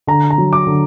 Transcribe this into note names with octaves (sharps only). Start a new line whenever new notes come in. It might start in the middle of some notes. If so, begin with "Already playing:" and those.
D3 A#5
A#5
F#3
D6
D3